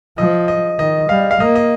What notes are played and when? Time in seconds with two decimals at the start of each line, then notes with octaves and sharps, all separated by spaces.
0.18 F3 D#5
0.48 D#5
0.79 D#3 D#5
1.09 G3 F5
1.31 F5
1.40 A#3 D#5
1.55 D#5